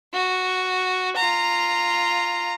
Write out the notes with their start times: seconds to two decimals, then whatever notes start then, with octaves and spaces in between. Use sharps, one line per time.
0.13 F#4
1.16 F4 A#5